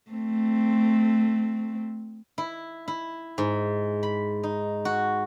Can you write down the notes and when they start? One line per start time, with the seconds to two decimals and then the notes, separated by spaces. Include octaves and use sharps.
0.11 A3 C4
2.38 E4
2.88 E4
3.38 G#2
4.03 B5
4.43 D#4
4.85 F#4